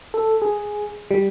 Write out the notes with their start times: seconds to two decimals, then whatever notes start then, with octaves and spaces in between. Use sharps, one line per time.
0.14 A4
0.42 G#4
1.11 G3